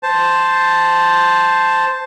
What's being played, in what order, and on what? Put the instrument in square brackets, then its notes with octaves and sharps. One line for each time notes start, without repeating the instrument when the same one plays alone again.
[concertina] C5 A5